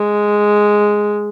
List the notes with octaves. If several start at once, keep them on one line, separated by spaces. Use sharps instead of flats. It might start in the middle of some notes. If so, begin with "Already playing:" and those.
Already playing: G#3